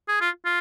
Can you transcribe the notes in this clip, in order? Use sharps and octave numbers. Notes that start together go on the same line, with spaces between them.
G#4
F4
F4